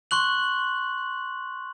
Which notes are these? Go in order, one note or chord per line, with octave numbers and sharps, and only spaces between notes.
C6 C#6 F#6 F#7